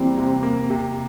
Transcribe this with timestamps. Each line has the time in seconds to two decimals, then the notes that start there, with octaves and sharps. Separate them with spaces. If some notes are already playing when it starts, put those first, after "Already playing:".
Already playing: E3 G3 A#3 C4
0.17 C3
0.43 A#3
0.70 C3